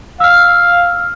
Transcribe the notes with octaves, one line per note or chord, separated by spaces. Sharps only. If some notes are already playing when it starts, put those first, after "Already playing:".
F5 E6 F6